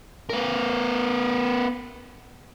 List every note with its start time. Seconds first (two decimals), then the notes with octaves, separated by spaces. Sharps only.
0.30 B3 A#4